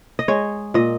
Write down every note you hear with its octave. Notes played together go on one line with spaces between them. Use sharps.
D#5
G#3 C#5
A#2 D#5